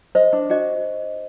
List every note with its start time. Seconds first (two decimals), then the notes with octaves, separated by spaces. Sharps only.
0.15 C5 D#5
0.33 D4
0.50 F#4 D#5